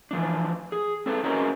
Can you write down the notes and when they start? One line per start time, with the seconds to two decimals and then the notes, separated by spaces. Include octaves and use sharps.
0.11 E3 F3 D4
0.72 G#4
1.06 C4 A4 B4
1.24 C#4 F#4 G#4 A#4 C5 D#5